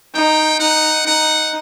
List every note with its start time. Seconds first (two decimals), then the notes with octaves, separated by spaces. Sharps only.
0.15 D#4 G5
0.60 D#4 F#5
1.06 D#4 F#5